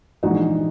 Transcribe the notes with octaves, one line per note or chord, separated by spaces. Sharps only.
A#1 G#2 E3 D#4 F#4